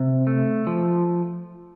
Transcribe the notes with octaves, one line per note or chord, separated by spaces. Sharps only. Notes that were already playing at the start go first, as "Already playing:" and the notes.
Already playing: C3
A3
F3